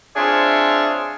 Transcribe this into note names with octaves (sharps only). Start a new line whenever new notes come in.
C4 D4 F4 G#4 C#5 E5